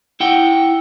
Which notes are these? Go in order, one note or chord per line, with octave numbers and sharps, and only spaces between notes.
E4 F#5 G5